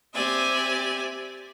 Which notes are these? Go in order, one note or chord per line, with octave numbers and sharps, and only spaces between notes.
C4 G4 D5 E5 G#5